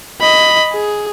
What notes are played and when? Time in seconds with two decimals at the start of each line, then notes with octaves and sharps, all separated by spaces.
0.21 D#5 B5
0.72 G#4